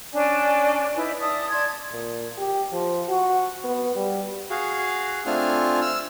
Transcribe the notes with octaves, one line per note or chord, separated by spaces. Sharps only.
C#4 D4 D5 G#5
D#4 E4 B4
D5 E5 A5 D#6
D5 A5 C6 G#6
A#2
G4
F3
F#4
B3
G3
F#4 G#4 F5
A3 C4 D4 F4 G#5 F6
E6 F6